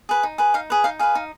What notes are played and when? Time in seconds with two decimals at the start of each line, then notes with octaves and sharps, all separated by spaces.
0.09 G#4 B4
0.23 D#4
0.38 G#4 B4
0.54 D#4 F5
0.70 G#4 B4
0.84 D#4 F5
0.99 G#4 B4 F5
1.15 D#4